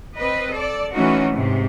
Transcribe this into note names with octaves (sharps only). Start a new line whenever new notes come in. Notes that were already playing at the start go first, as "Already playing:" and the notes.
C4 B4 D#5
A4 D5
E3 A3 C#4 D#4 F#4
G#2 C3